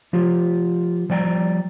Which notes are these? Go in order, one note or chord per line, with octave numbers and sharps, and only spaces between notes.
F3 F4 G4
F3 G3 D5 F#5 G5 A#5